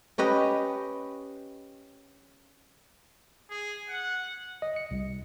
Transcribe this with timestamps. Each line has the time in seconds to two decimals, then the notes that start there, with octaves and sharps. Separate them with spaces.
0.18 C#4 G4 B4 D#5
3.51 G#4
3.89 F#5
4.62 D#5
4.76 C#7
4.91 C2